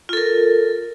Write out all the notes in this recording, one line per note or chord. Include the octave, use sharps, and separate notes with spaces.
F4 A4 A#4